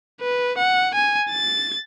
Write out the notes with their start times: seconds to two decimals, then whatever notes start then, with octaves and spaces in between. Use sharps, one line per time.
0.21 B4
0.58 F#5
0.95 G#5
1.30 A6